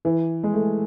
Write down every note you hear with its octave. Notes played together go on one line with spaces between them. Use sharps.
E3
G#3
A3